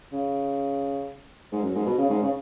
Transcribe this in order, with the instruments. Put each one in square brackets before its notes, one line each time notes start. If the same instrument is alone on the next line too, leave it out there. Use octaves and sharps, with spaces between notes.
[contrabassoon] C#3
G#2
F#2
G#2
B2
C#3
G#2
C#3